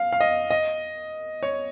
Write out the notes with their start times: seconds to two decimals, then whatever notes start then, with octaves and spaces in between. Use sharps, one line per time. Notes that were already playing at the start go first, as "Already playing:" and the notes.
Already playing: F5
0.13 F5
0.20 D#5
0.50 D#5
1.43 C#5